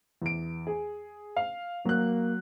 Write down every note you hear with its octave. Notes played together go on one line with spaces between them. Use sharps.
E2 D7
G#4
F5
F#3 A#3 F#6